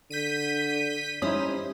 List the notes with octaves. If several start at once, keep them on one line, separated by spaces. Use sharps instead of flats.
D3 G6 B6 D#7
G3 C#4 D#4 E4 C5 D#6